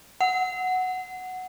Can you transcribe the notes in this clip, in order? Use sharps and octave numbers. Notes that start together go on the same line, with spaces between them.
F#5